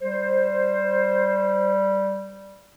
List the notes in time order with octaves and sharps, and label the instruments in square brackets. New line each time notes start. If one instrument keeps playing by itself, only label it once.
[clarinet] G3 [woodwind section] C5